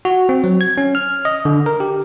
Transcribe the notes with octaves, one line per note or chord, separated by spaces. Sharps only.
F#4
C4
F#3
G#6
C#4
F6
D#5
D3
A#4
G4